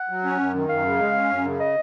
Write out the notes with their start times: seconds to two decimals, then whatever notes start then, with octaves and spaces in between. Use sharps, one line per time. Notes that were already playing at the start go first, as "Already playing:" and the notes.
Already playing: F#5
0.09 F#3
0.24 C#4
0.40 F#2
0.55 D#3
0.69 F#2 F5
0.85 C#3
1.00 G#3
1.15 C#4
1.30 F#2
1.45 C#3
1.60 D#5